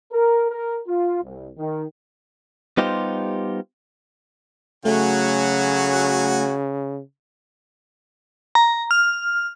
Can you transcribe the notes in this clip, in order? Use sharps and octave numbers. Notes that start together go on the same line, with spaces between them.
A#4
A#4
F4
C2
D#3
G3 B3 D#4 F4 G4 C5
C#3 F#3 A3 F#4 G#5
A#5
F6